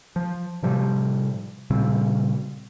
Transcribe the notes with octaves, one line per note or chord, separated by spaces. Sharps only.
F3
A2 C3 F3 G3
A#2 C#3 G3 C4